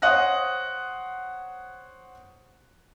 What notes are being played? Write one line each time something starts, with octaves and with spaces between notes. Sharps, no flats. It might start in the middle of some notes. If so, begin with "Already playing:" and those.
C5 C#5 F#5 D#6 F#6 A#6